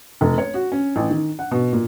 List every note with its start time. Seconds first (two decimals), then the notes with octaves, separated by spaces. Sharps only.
0.21 F1
0.38 C#5
0.54 F#4
0.72 C#4
0.96 A1
1.11 D#3
1.39 F#5
1.51 B2
1.73 A#2